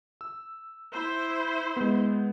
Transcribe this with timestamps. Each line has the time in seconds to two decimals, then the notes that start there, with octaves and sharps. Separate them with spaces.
0.21 E6
0.93 E4 C5
1.76 G#3 B3